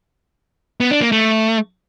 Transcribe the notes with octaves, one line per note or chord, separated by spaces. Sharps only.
B3
D4
A#3
A3